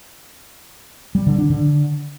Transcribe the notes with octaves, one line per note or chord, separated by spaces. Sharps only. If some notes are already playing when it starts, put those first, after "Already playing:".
G3
D3
D4
D3